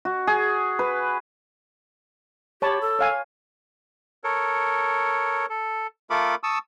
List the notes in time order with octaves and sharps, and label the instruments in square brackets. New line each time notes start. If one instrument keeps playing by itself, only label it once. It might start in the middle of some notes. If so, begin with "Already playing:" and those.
[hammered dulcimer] F#4
G#4
B4
[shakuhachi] G4 [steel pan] C#5 A5 B5
[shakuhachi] A4
[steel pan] C#5 F5 G#5
[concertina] A4 A#4 C#5
A4
A3 F4 A4 A#4 B5 D6
A5 C#6 D#6 E6